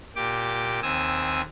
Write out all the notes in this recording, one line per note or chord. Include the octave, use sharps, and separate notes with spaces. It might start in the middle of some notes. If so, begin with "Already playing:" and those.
A#2 G4 D6
D#2 C4 G#5 D#6 E6